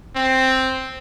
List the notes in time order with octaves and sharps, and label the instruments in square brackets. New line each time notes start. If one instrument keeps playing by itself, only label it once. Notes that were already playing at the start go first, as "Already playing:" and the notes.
[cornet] C4